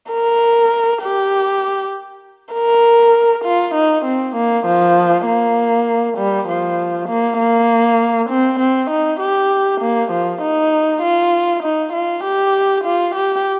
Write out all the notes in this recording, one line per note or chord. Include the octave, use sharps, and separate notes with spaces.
A#4
G4
A#4
F4
D#4
C4
A#3
F3
A#3
G3
F3
A#3
A#3
C4
C4
D#4
G4
A#3
F3
D#4
F4
D#4
F4
G4
F4
G4